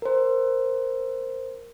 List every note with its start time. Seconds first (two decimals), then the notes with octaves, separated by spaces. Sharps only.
0.02 A#4 C5